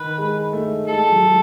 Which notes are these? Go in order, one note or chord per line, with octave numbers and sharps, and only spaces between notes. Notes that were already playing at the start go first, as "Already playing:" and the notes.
Already playing: D#3 B4
G#3
A3
G#3 A4
G#3
F#3
G#3